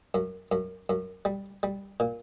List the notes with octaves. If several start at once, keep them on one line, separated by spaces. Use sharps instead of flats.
F#2
F#2
F#2
G3
G3
A#2